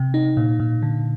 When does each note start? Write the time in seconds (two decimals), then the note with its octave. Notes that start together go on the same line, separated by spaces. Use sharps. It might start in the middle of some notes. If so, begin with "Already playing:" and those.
Already playing: C3
0.14 D#4
0.37 A#2
0.60 A#2
0.83 D3